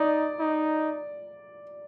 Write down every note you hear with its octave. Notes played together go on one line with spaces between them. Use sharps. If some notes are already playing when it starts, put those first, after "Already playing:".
Already playing: D#4 D5
D#4